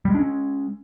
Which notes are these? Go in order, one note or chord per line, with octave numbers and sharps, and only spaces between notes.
G3 G#3 C#4 D4